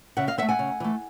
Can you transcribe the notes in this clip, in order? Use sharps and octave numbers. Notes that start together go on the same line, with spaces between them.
C#3 E5 F#5
D#5 F5
E3 A3 E5 F#5
F#5 G#5
C#3
E3 A3